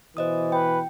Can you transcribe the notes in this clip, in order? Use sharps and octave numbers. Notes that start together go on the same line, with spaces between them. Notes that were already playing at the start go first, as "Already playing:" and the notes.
B2 E3 C5 D#5 D#6
B4 G5